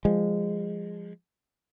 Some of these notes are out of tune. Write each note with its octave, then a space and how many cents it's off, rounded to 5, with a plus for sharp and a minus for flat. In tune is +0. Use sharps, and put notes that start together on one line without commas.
F3 +0 G#3 -20